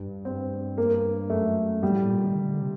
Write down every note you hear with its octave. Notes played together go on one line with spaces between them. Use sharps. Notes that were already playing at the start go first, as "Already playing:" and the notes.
Already playing: G2
C4
A#3
F#2 A3
G2 G3
A2
A#2
D#3
D3
C3